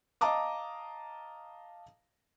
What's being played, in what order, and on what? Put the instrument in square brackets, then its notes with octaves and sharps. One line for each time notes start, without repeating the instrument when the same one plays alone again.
[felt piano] D#5 F5 A5 A#5 D6 D#6